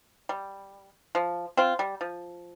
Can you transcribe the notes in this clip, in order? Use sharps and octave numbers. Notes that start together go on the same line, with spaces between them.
G3
F3
C4 F4
G3
F3